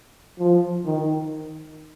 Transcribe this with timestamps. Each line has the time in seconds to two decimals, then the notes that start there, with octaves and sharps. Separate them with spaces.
0.39 F3
0.86 D#3